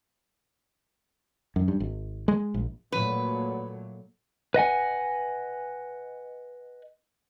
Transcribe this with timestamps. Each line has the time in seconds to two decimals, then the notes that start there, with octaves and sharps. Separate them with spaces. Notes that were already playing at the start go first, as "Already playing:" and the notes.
1.56 F#2
1.68 G2
1.80 G#1
2.28 G#3
2.54 A#1
2.92 A#2 F#3 A3 B4
4.54 B4 D#5 F#5 G#5